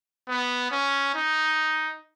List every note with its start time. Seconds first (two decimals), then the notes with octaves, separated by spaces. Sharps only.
0.28 B3
0.71 C#4
1.15 D#4